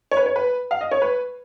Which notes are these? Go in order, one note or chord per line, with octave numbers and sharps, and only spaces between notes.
C#5
B4
C#5
B4
F5
D#5
C#5
B4